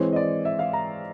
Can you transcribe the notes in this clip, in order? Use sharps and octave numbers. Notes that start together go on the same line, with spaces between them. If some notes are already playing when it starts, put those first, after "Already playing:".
Already playing: E3 G#3 C4 C#5
D#5
D5
E5
F5
A#5